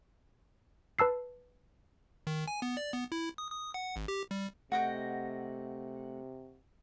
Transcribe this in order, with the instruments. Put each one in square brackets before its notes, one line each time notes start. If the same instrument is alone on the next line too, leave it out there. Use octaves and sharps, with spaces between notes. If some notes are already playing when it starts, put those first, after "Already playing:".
[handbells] B4 A5 E6 C7
[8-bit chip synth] D#3
G#5
B3
D5
B3
E4
D#6
D#6
F#5
G#1
G4
G3
[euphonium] C3 [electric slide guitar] A3 F#5 [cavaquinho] F#4 D#5 G5